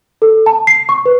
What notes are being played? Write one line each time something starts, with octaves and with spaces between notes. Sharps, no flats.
A4
A5
C7
C#6
B4